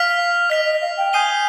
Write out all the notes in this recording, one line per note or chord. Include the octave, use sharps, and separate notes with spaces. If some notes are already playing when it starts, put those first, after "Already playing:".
Already playing: F5 F6 B6 F7
D#5 F6 B6 F7
D#5
F5
G5
G#5 D#6 G6 C7 D#7 G7